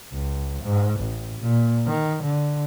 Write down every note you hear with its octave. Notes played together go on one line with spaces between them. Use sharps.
C#2
G#2
A1
A#2
D#3
D3